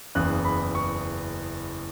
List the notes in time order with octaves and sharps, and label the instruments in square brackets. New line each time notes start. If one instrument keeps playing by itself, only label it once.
[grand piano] F#1 E2 C#3 F#6
B5
C#6